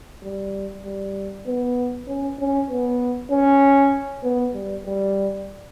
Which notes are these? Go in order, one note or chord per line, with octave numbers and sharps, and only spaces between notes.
G3
G3
B3
C#4
C#4
B3
C#4
B3
G3
G3